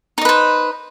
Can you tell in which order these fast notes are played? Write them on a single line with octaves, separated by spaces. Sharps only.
D#4 D#5 B4 C5